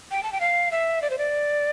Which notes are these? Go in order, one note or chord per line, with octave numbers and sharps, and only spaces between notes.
G5
A5
G5
F5
E5
D5
C5
D5